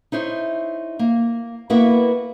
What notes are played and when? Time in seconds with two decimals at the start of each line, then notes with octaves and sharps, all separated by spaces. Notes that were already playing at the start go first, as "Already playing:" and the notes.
0.12 D#4 E4 C5 C#5
0.99 A#3
1.70 A#3 B3 E4 F#4 A#4 B4